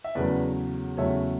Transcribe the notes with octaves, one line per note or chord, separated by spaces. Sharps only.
E5
E2 C#3 F#3 A3 B4 D5
E2 C#3 F#3 A3 C#5 E5